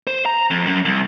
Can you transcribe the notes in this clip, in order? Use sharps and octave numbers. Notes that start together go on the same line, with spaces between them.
C5
A#5
F2
F#2
C2